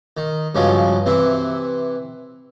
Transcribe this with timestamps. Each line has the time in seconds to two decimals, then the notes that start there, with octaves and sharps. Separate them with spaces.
0.17 D#3
0.55 G2 C#3 F3 F#3 G#3
1.06 C3 E3 C4 E4